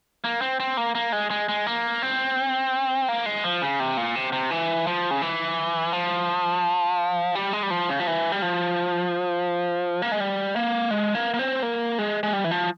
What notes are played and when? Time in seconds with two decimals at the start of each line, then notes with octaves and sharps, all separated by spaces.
0.24 A#3
0.42 C4
0.60 C4
0.77 A#3
0.95 A#3
1.12 G#3
1.31 G#3
1.49 G#3
1.67 A#3
2.02 C4
3.08 A#3
3.26 G#3
3.44 F3
3.62 C#3
3.80 C3
3.97 A#2
4.15 C3
4.32 C3
4.51 E3
4.87 F3
5.11 C#3
5.22 E3
5.93 F3
7.35 G3
7.53 G#3
7.63 G3
7.70 F3
7.89 C#3
8.00 F3
8.07 E3
8.32 G3
8.42 F3
10.02 A#3
10.12 G#3
10.20 G3
10.56 A#3
10.91 G#3
11.15 A#3
11.34 A#3
11.39 C4
11.63 A#3
11.98 G#3
12.23 G#3
12.33 G3
12.44 E3
12.51 F3